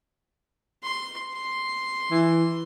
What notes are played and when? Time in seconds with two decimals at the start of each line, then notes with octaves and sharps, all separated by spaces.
0.83 C6
1.34 C6
2.11 E3